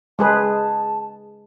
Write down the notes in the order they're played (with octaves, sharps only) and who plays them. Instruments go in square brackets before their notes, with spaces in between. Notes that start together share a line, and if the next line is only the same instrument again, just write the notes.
[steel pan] G#3 G#4 B4 [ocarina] A5